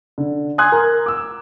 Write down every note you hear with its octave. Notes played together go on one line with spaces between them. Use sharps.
D3
G#5 C6 D#6 F#6 G#6
A#4
D6 E6